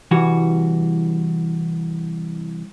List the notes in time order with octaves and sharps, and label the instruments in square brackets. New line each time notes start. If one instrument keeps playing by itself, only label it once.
[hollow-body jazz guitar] C2 E3 G3 F#4